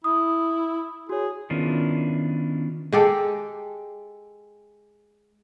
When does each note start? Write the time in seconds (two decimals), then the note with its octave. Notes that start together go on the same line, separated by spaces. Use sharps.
0.04 E4 D#6
1.09 F#4 G#4 C#5
1.50 D#3 B3 C#4 D4 E4 F4
2.92 G#3 G4 A4